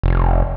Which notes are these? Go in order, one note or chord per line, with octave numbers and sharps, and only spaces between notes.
F1